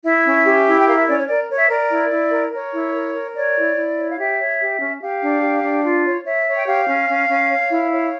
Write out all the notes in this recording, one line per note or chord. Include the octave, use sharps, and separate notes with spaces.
E4 E5
C#4
G4
E4
G5
A#4 F5
E5
C#4 D5
C#5
A#4 D5
C#5
E5
A#4 D5
E4
E4
A#4
A#4 C#5
E4
A#4
A#4
C#5 D5
E4
E4
C#5
F5
G4 E5
C#5
G4
C#4
G4 F5
D4
G4
D4
F4
C#5
C#5 E5
C#5
G5
G4 F5
C#4
C#4
C#4
C#5
E4
C#5